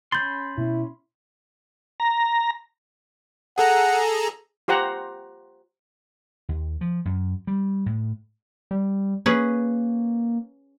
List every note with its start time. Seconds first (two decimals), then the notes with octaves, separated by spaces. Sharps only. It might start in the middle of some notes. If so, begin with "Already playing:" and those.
0.12 C#4 B5 C6 G6 A6
0.58 B2 B3 E4
2.00 A#5
3.58 G#4 A4 F#5 A#5
4.68 F4 G4 C5 F#5 A#5
6.49 D#2
6.81 F3
7.05 F#2
7.47 G3
7.86 A2
8.71 G3
9.26 A#3 C#4 G#4 B4